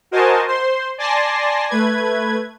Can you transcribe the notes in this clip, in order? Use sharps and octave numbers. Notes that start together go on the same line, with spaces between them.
F#4 A#4 C5 D#5 G#5 A5
C5 C6
D5 G#5 A5 C6 A#6 C7
A3 B4 G#6